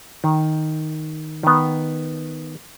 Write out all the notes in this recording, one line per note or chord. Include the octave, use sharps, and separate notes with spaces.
D#3
D#3 B3